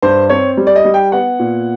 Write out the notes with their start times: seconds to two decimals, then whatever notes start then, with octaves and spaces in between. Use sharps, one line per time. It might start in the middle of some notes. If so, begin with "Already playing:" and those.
0.02 G2 C5
0.29 C4 C#5
0.57 G3
0.67 D5
0.75 D#5
0.85 G3
0.94 G5
1.12 B3 F#5
1.39 A#2